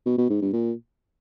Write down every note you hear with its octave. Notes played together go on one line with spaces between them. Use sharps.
B2
B2
G#2
G2
A#2